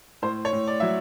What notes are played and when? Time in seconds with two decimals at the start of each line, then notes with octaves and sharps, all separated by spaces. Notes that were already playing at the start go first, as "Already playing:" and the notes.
0.22 A2 C5
0.45 C#5
0.53 A2
0.67 D5
0.80 F#3 E5